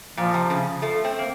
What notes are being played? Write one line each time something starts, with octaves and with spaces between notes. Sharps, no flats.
A#2 F3
C3
C#3
F3 A3
A3 C4
A#3